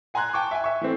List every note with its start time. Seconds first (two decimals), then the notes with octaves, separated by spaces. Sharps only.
0.14 F#5 G#5 A#5 C6 F#6 G#6
0.33 G5 A5 C#6 D6
0.51 E5 G#5
0.64 E5 C#6
0.81 E3 A3 C4